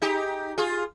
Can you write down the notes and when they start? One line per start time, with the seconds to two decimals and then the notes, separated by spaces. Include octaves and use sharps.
0.02 D#4 G4
0.58 F4 G#4